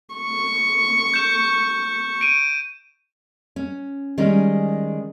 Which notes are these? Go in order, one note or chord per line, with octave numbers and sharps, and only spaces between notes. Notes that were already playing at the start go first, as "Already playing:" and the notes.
C#6
G6 E7
D7 D#7
C#4
D#3 G3 G#3 C#4